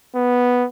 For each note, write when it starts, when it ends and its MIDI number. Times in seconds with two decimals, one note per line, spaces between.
0.15 0.66 59